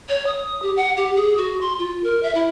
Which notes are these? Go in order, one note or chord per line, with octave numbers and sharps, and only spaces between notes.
C#5
D#6
G4
F#5
G4
G#4
F#4
C6
F4
A#4
E5
E4